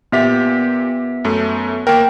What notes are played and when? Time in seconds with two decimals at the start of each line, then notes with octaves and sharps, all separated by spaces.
0.12 A#2 B3 G4 E5 B6
1.25 F#2 A3
1.87 A#3 A#4 G5